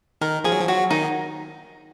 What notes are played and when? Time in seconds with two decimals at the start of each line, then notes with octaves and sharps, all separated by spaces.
0.21 D#3 A#4
0.44 F3 G#4
0.52 F#3
0.60 F3
0.67 F#3 F#4
0.91 D#3 D#4